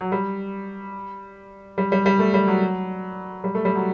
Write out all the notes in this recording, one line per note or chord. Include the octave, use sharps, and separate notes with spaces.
F#3
G3
G3
G3
G3
A3
G3
F#3
G3
A3
G3
F#3